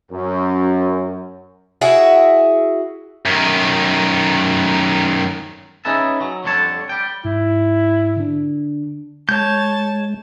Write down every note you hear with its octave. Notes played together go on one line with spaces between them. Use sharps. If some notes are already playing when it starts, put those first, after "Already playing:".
F#2
E4 F#4 G#4 E5
F#2 D#3
C#4 D#4 G#4 B4 E5 A5
F#3
F2 D3 G3 D4 C#5 A5
G3 G5
G#2 E4
D3 D4
G#3 C#5 A5 G6